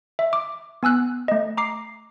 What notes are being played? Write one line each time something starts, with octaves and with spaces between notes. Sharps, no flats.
E5
D6
B3 G#5 E6 F#6
A3 D#5
A#5 D6 C7